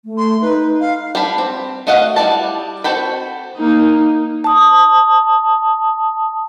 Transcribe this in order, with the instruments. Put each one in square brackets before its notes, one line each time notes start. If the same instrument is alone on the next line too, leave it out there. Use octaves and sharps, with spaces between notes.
[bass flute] A3
[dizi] C6
[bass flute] D#4 [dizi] B4
[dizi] F5
[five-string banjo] G3 D4 B5
C4
A3 F#4 D#5 F5 F#5
G3 E4 D5 A5
C4 F#4 A4 G5 B5
[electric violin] A#3 D#4
[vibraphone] A5 D#6